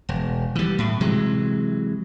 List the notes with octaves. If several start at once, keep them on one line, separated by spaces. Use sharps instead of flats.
E1
E3 G3
A2
C3 E3 F#3 G#3